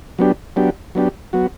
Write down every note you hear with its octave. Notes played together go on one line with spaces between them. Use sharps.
F#3 B3 D4 G4
F#3 B3 D4 G4
F#3 B3 D4 G4
F#3 B3 F#4